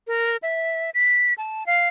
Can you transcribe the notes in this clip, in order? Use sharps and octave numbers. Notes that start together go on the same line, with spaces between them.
A#4
E5
B6
A5
F5